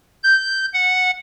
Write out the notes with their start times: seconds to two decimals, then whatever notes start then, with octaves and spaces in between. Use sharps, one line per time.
0.23 G6
0.74 F#5